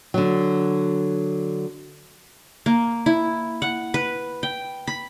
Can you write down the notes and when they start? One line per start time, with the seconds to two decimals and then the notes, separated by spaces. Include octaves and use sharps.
0.14 D3 F#3
2.66 A#3
3.06 E4
3.62 F#5
3.94 B4
4.43 G5
4.87 B5